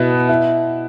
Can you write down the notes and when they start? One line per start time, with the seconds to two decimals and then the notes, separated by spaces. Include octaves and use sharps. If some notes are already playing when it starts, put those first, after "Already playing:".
Already playing: B2 B3 E4
0.29 E4